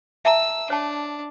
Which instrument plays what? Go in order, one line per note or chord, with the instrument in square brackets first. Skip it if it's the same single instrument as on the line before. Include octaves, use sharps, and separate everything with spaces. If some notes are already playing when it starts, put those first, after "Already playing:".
[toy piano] E5 A5 A#5 [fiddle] E6
[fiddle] D4 [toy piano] C#5 A5